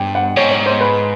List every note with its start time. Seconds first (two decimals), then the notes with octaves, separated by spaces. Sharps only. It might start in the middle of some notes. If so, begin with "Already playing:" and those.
Already playing: G2 G5
0.15 F#5
0.36 G#2 C#5
0.51 C#5
0.66 C5
0.81 B4